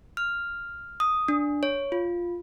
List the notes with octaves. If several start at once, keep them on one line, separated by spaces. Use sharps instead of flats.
F6
D#6
D4
C#5
F4